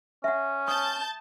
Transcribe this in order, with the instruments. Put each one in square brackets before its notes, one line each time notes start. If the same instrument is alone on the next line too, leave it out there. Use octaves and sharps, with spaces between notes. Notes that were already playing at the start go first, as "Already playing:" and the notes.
[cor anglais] C#4 [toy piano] E5 F#5
[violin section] A5 G6 [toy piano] D#6